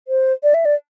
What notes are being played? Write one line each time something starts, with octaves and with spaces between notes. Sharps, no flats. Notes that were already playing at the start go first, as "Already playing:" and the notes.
C5
D5
E5
D5